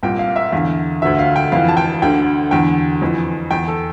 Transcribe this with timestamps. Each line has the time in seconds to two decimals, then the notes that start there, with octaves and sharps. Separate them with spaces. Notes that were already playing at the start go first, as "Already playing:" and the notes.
0.03 C2 A#2 G5
0.19 F5
0.36 E5
0.52 E2 D3 F5
1.02 D2 D3 E5
1.19 F5
1.36 G5
1.52 F2 E3 F5
1.68 A5
1.77 G5
2.02 D2 D3 G5
2.51 E2 D3 G5
3.02 F2 E3
3.51 E2 E3 G5
3.68 A4